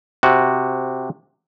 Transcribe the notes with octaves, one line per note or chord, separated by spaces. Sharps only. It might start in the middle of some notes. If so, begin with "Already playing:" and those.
C3 F#4